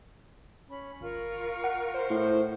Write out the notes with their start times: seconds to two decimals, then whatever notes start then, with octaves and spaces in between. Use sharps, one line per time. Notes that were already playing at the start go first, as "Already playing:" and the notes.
0.69 C#4 B5
1.01 G1 F4 A#4 C#6
1.64 F#5
1.94 C5
2.10 A2